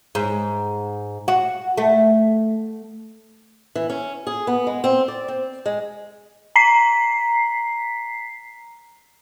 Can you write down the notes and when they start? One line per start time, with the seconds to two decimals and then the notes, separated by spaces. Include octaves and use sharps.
0.15 G#2
1.28 F#4
1.77 A3
3.75 E3
3.90 C#4
4.27 G#4
4.47 B3
4.67 G#3
4.84 C4
5.08 D5
5.28 C4
5.66 G#3
6.56 A#5 B6 C7